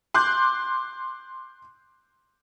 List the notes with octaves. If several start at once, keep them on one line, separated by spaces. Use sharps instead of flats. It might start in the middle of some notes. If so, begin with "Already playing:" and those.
C6 D6 F#6 G6